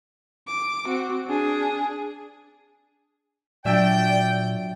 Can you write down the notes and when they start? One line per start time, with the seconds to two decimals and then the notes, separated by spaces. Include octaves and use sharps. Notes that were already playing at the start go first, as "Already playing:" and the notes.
0.47 D6
0.86 C4 F#4
1.27 D4 G#4
3.65 A#2 F#3 D4 D5 E5 G5